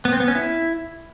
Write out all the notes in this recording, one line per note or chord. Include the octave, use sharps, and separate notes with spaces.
B3
C4
B3
C#4
E4